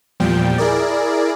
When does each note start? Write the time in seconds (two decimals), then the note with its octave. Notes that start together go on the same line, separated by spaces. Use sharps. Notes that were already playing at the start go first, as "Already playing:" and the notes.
0.20 E2 A#2 F3 G3 G5
0.58 E4 G#4 A#4 D5